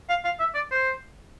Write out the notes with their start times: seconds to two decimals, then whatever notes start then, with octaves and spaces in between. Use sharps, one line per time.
0.09 F5
0.24 F5
0.40 E5
0.55 D5
0.71 C5